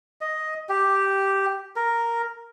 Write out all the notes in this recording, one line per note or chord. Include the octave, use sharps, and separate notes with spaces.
D#5
G4
A#4